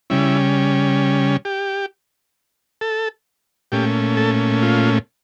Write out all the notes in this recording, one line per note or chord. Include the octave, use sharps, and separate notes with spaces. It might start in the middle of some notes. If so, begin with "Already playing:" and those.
C#3 G3 C#4 E4
G4
A4
A#2 A3 C#4 G4
A4
F4